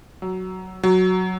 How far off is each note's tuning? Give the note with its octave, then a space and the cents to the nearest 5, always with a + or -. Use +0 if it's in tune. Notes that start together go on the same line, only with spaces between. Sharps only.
F#3 +5
F#3 +0